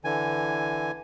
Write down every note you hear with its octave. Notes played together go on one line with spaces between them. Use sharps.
D3 E3 G#5